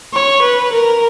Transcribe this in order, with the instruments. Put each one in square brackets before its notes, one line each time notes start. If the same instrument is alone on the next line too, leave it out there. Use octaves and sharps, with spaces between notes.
[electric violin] C#5
B4
A#4